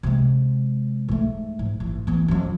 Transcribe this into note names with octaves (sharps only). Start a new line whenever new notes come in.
C3 G#3
G#2 A3
G#2
A1
E3 B3
F2 C#4